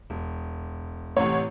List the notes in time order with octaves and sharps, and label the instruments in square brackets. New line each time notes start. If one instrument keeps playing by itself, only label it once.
[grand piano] E1
[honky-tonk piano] A1 C#5 [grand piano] A2 C3